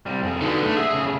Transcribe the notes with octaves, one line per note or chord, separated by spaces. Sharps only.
C3 G3
F2 G#4
D3 D#4 F#4 B4
A3
G#4 E5
A2 C#3